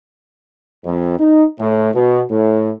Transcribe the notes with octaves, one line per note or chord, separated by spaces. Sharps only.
F2
D#4
A2
B2
A2